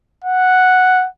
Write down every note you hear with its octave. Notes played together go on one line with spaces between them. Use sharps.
F#5